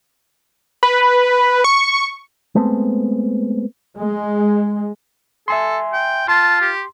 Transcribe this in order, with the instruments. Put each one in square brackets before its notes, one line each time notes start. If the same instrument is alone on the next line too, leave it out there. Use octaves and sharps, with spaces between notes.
[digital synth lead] B4
C#6
[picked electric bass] G#3 A3 B3 C4
[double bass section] G#3
[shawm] A4 [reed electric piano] E5 G#5 C6
[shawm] G5
[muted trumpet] F4 [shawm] A5 [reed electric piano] C6
[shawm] G4